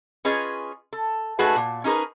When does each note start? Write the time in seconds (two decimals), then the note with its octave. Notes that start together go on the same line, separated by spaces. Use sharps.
0.25 C#4 F4 G#4 B4 C#5 D#5
0.93 A4
1.39 A3 D#4 F#4 G#4 B4
1.56 A#2
1.84 C#4 D#4 G#4 A#4 B4